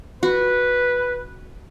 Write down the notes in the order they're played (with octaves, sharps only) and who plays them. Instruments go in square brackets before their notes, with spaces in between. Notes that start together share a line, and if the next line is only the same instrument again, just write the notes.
[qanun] F#4 [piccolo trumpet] B4